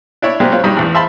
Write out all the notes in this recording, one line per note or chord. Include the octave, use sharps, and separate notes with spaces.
D4 E4 C#5
F#3 G#3 A#3 C4 D4 G4
F#3 C4 F4 C#5
G2 F#3 G3 D#4
A1 E2 A2
C5 E5 F5 A5 B5 C6